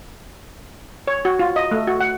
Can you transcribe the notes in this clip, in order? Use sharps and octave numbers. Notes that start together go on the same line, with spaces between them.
C#5
F#4
F4
D#5
A3
F#4
F#5